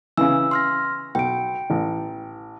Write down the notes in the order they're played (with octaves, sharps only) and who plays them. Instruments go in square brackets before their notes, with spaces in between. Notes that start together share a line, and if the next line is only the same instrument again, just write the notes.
[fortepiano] C#3 E3 [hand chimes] E6
[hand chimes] C6 F6 A#6
[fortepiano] B1 [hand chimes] G5 D7
[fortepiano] A1